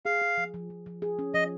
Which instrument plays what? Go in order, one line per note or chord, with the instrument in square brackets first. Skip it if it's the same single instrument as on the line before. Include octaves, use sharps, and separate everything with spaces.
[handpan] G#4 [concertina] F5
[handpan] G#4
F3
F3
F3
F3
G#4
C#4
[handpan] F3 [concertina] D#5